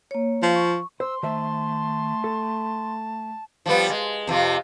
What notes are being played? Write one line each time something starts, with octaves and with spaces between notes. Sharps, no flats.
A#3 C#5
F3 F5
C#6
C5 C6 E6
D#3 A3 C5 E5 A5
A4
F3 G3 B3
G#3
F2 C3 F3